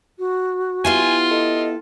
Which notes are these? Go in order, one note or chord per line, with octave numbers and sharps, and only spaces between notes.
F#4
B3 E4 F4 G4 G#5
A4 D#5